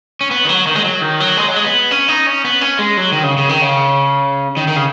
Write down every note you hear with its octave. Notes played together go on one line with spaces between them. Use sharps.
C#4
B3
D#3
F#3
D#3
G#3
F#3
D#3
F#3
G#3
F#3
G#3
B3
C#4
D#4
C#4
B3
C#4
G#3
F#3
D#3
C#3
C#3
D#3
C#3
D#3
D#3
C#3